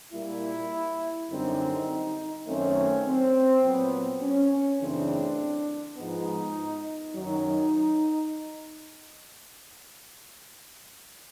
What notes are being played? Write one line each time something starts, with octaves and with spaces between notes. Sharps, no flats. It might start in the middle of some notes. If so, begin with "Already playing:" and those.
A#2 G3 A#3 E4
F#2 D3 G3 C4 D#4
F#2 D#3 F#3 A3 C4 C#4
C4
A#2 F#3 B3 C4
C#4
F#2 C#3 E3 A3 C4 D4
G#2 F3 G#3 B3 D#4
F#2 D#3 F#3 D#4